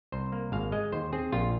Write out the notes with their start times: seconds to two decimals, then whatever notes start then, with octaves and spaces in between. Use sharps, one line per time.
0.12 C2 C5
0.32 A#3
0.52 G#1 F5
0.72 G#3 D#5
0.92 D#2 C5
1.12 C4 G#4
1.32 A#1 F4